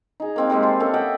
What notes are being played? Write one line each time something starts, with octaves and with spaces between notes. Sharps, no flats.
D#4 G#4
A#3 C4 D#4
G3 G#3 A#3 E5
C5 A5
A#3 C#4 A4
D#5 E5 F#5 G5